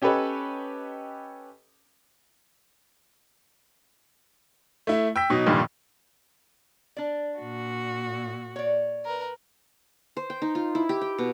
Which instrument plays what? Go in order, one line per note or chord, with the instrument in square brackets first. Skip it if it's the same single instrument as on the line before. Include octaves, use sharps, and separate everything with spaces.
[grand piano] C#4 G4 A4 B4 C#5 D#5
[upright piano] A3 E4
G5 E6 B6
B2 F#3 D#4
F1 G2 A#2 D#3
[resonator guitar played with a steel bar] D4 D5
[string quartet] A#2 F#4
[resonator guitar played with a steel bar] C#5 D5
[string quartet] A#4 B4
[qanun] C5
G5
D#4
F4
E4
G4
G5
B2